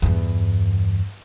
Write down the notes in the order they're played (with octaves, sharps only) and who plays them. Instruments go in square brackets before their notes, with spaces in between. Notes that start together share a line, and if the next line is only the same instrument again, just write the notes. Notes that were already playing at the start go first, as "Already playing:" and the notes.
[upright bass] E2 G2